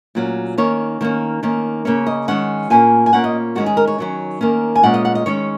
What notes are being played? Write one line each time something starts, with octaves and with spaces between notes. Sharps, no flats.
A#2 F#3 C#4
D#3 A#3 C#4 C#5
D#3 A#3 C#4
D#3 A#3 C#4
C#3 A#3 C#4 C#5
D#5
D#3 G#3 C#4 F#5
A#2 A#3 C#4 G#5
G#5
A#2 A#3 C#4 F#5
D#5
D#3 G#3 C#4 F#4
G#4
A#4
C#5
D#3 F#3 C#4
D#3 A#3 C#4
G#5
A#2 G#3 C#4 F#5
D#5
F#5
D#5
D#3 G#3 C#4 C#5